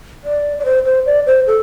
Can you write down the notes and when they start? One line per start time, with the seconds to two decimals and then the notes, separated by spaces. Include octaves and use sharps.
0.24 D5
0.59 D5
0.65 C5
0.85 C5
1.06 D5
1.26 C5
1.47 A4